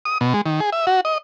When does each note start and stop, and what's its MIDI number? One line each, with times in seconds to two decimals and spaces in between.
0.05 0.18 87
0.21 0.33 47
0.34 0.41 56
0.46 0.60 51
0.61 0.70 68
0.73 0.86 76
0.87 1.01 66
1.05 1.18 75